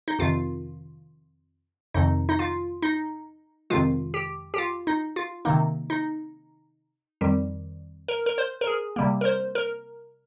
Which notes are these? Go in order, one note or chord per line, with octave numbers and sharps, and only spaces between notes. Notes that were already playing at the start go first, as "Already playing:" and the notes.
D#4
F2 C3 D#3 F4
F2 C3 D#3 D#4
D#4
F4
D#4
F2 C3 D#3 G#3 F4
G4
G4
F4
D#4
F4
C3 D#3 A#3 D#4
D#4
F2 D#3 G3
A#4
A#4
C5
A#4
G#4
C3 G3 A#3
A#4
C5
A#4